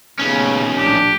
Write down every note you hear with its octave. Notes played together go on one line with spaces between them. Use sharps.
D#2 A#2 C#3 A3 B3 C#4
A#1 A2 A3 D4 G4